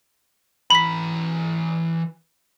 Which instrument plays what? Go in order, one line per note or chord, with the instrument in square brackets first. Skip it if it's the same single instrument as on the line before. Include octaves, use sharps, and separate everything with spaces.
[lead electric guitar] E3 A#5 [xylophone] B5 B6